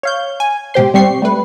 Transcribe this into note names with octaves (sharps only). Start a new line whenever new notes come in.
C#5 F5 G6
G#5
G#2 B2 G4 C5 C6
G3 C4 G4 C#6 C7
G3 A3 B4